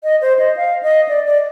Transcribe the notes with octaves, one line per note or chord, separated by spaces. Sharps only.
D#5
C5
D#5
F5
D#5
D5
D5